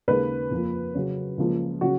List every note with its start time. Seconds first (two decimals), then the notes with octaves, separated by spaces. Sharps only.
0.08 D#2 C#3 G#3 B4
0.51 F2 F3 A#3
0.94 C#3 F#3 C#4
1.38 C#2 C#3 F3 A#3
1.81 C#3 F#3 C#4 F#4